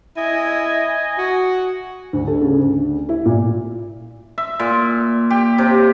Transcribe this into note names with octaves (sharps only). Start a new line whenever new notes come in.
E4 D#5 G#5
F#4
D2
A4
C#3
D2
E4
A#2
E5
A#2
G4
C3